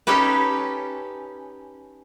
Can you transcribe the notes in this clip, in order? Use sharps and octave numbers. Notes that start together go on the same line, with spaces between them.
C#4 D#4 G4 A4 B4